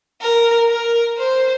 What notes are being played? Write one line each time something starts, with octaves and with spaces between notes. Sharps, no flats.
A#4
A#4
C5